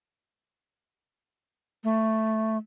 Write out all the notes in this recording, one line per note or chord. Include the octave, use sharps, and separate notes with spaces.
A3